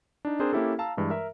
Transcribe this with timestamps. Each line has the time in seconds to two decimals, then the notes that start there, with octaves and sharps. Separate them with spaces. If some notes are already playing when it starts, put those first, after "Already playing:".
0.25 D4 D#4
0.39 C4 D4 G#4 A#4 C5
0.53 A#3 C#4 E4 G4 A4
0.79 F5 A5 A#5 E6
0.97 G2 E3 G#3
1.10 A#4 E5